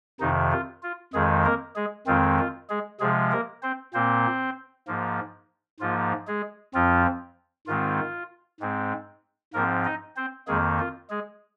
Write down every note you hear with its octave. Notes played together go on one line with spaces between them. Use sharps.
F2 C3 D#3 D#4
F4
F4
F2 D#3 G#3 G#4
A#3 A#4
G#3 G#4
F2 D#3 G#3 C4 F4
F4
G#3 G#4
C3 F3 G#3 G#4
A#3 A#4
C4 C5
A#2 A#3 C4 C5
G#2 F3 A#3
G#2 F3 A#3 F4
G#3 G#4
F2 F3 C4 F4
G#2 D#3 G#3 C4 F4
G#2 G#3 C4
G#2 F3 A#3 C4 A#4
D#4 D#5
C4 C5
F2 D#3 G#3 A#3 G#4
F4
G#3 G#4